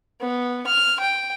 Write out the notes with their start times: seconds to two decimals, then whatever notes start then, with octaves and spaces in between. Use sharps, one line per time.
0.21 B3
0.67 F6
1.00 G5